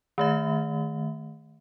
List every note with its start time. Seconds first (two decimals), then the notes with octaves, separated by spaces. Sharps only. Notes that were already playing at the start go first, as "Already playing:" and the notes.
0.18 D#3 A3 E5